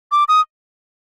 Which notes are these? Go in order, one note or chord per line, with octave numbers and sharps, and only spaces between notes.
D6
D#6